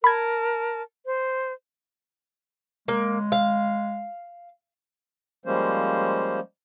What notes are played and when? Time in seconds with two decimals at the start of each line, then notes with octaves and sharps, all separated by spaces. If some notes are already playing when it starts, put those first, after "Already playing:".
0.04 A#4 A5 B5 G#6
1.06 C5
2.88 G#3 A#3
3.32 F5
5.46 F3 G3 G#3 A#3 C#4 C5